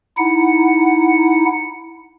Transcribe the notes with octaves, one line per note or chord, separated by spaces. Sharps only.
D#4 E4 F#5